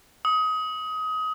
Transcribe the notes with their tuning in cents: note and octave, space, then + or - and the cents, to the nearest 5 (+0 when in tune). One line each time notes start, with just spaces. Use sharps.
D#6 +25